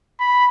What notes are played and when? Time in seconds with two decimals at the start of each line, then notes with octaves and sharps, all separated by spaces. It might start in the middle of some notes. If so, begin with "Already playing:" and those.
0.20 B5